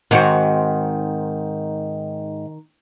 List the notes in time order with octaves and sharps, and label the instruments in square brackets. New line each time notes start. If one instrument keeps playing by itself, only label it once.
[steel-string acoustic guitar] G#2 [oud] D#3 C4 F#4